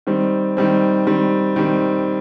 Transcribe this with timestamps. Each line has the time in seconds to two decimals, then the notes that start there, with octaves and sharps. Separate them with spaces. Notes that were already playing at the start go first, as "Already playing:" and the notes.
0.07 D#3 G3 C4
0.57 D#3 G3 C4
1.07 D#3 G3 C4
1.56 D#3 G3 C4